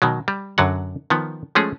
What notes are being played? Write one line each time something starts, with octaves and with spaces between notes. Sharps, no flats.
B2 D#3 F#3
G3
F#2 D3 F#3 F#5
D#3 F3 B3
F3 G#3 A3 C#4 G#4